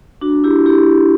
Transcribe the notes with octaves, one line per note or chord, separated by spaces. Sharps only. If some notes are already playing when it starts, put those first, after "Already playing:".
D4 F#4
E4 G4
E4 G4